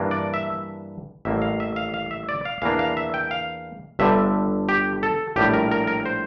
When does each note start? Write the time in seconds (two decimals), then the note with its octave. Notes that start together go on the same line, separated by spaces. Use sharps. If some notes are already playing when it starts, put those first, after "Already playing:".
Already playing: G2 E3 A#3 D4
0.11 D5
0.34 E5
1.25 A1 A2 G3 A#3 E5
1.42 F5
1.60 E5
1.76 F5
1.94 F5
2.11 E5
2.29 D5
2.45 F5
2.62 E2 E3 A#3 D4 F5
2.79 F5
2.97 E5
3.14 G5
3.31 F5
3.99 G1 G2 D3 G3 E5
4.69 G4
5.03 A4
5.36 A#1 A2 G3 G4
5.54 A#4
5.71 A#4
5.87 A#4
6.06 C5